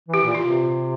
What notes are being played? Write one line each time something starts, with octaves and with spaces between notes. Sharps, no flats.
E3
G4
A#2
F4
C3